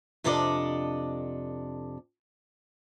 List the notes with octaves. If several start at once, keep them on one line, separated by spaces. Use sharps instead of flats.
F2 C3 D4 A4 D5 D#5